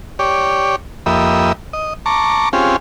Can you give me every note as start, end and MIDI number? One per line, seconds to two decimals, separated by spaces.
0.19 0.76 67
0.19 0.76 73
0.19 0.76 74
1.06 1.52 41
1.06 1.52 58
1.06 1.52 67
1.06 1.52 75
1.06 1.52 76
1.06 1.52 83
1.73 1.93 75
2.06 2.49 81
2.06 2.49 82
2.06 2.49 85
2.06 2.49 86
2.53 2.76 60
2.53 2.76 61
2.53 2.76 65
2.53 2.76 67
2.53 2.76 68